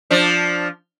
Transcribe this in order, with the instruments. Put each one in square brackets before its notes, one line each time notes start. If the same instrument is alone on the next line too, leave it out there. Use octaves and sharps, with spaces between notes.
[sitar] F3 D4